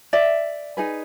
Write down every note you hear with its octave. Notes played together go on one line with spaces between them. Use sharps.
D5 E5
D#4 G#4 B4